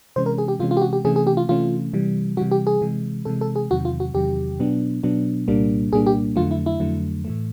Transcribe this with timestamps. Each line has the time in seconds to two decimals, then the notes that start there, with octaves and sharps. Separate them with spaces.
0.16 C3 E3 G#3 C#4 C5
0.26 A#4
0.38 G#4
0.48 G4
0.59 C3 E3 G#3 C#4 F4
0.71 F4
0.77 G4
0.81 F#4
0.93 G4
1.05 C3 E3 A3 C#4 G#4
1.16 G#4
1.27 G4
1.37 F4
1.49 C3 E3 A3 C#4 F4
1.93 C3 E3 G3
2.37 C3 E3 G3 F#4
2.51 G4
2.67 G#4
2.82 C3 E3 G#3
3.25 C3 E3 G#3 A4
3.41 A4
3.56 G#4
3.71 E2 C3 D#3 F#3 F#4
3.85 F4
4.00 F#4
4.14 E2 C3 D#3 F#3 G4
4.59 B2 F#3 B3 D4
5.03 B2 F#3 B3 D4
5.48 C2 A#2 G3 A#3 D4
5.92 C2 A#2 G3 A#3 D4 G#4
6.06 G4
6.36 F2 D3 F#3 A3 F4
6.51 E4
6.66 E4
6.80 F2 D3 F#3 A3
7.25 A2 E3 A3